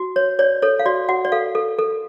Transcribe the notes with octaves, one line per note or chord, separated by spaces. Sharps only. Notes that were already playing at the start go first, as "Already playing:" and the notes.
Already playing: F#4
C#5
C#5 D5
A4 C#5
F5
F#4 D5
F#4 F#5
D5
A4 F5
A4
A4